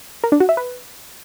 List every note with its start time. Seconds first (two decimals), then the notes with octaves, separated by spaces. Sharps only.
0.24 A#4
0.32 D4
0.40 F#4
0.49 E5
0.57 B4